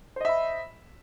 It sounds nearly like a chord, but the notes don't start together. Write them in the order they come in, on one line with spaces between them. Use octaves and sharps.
C5 D#5 E5 B5